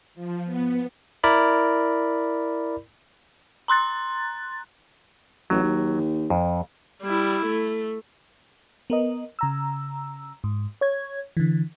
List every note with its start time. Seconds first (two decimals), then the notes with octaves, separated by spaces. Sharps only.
0.15 F3
0.45 B3
1.24 E4 A#4 D5 B5
3.68 A#5 C6 F#6 A6
5.50 A1 F#3
5.63 D#2
6.30 F2
7.03 G3 E4
7.46 A3
8.90 B3 A#4 D#5
9.39 C#3 A#5 E6
10.44 G#2
10.81 C#5 G#6
11.37 D3 E3